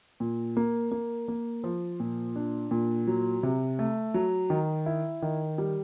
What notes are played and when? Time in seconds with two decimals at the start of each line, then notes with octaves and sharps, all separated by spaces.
0.20 A#2
0.57 A#3
0.91 A#3
1.28 A#3
1.64 F3
2.00 A#2
2.36 D4
2.71 A#2
3.07 F#3
3.43 C3
3.79 A3
4.14 F#3
4.50 D#3
4.86 E4
5.22 D#3
5.58 G3